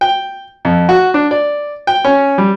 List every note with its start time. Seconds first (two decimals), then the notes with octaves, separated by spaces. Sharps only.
0.01 G5
0.65 F2
0.89 F#4
1.14 D4
1.31 D5
1.87 G5
2.05 C#4
2.38 G3